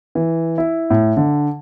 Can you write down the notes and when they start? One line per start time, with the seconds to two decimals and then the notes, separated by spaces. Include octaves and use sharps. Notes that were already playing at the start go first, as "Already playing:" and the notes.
0.15 E3
0.58 E4
0.90 A2
1.17 D3